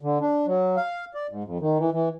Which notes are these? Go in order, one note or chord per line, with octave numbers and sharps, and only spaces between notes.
D3
D4
F#3
F5
D5
G#2
F2
D#3
E3
E3